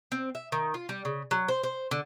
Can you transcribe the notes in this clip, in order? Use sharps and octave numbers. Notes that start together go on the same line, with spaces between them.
C4
E5
D#3
F4
G3
C#3
F#3
C5
C5
D3